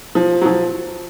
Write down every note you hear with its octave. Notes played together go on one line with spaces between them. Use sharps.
F3
F#3
F3